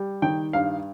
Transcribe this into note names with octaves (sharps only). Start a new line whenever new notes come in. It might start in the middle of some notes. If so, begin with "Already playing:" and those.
Already playing: G3
D#3 G5
G2 F5